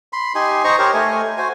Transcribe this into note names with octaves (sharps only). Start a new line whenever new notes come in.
B5 C6
D#4 G4 G#5 C6
D#4 C5 A#5 C#6
G4 A#4 C5 C#5
A3 G#5
F#4 C5 G#5